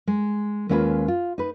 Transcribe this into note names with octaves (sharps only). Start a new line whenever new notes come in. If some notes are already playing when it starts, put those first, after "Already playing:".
G#3
D#2 G#3 C#4 E4 F4 B4
F4
D#4 B4